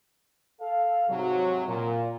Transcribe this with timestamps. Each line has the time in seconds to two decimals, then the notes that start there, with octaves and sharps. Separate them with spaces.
0.61 A4 F5
1.09 G#2 C3 F#3
1.68 A#2